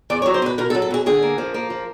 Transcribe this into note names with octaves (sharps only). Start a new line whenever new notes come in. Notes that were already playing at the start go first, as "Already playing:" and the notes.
E2 D5
C#5
F#3
C5
B2 B4
B2 A#4
A4
F#3
A4
B2 G#4
D3 G#4
A#3
F3
A#3
F3